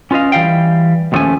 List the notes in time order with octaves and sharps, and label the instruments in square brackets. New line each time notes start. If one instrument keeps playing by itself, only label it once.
[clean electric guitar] C#4 F4 B4 D#5 F5
E3 G3 F5 G5
D#2 A2 F3 A3 C#4 G#5